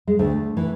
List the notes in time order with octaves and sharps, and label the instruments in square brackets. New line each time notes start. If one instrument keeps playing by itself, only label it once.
[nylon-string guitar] G#3
D2 A3
E3